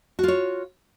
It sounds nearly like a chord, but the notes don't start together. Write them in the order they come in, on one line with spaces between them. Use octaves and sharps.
F#4 F4 C#5